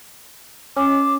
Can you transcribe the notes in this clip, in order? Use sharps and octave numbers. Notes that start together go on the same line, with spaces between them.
C#4 D6